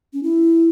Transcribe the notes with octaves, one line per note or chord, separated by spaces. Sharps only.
C#4
E4